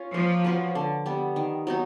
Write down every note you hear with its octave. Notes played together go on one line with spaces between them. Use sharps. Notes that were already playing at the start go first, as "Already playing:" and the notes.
Already playing: C#4 F4
F3 A#3
C#4 F#4 B4
D3
G3 B3
D#3
F#3 B3 D#4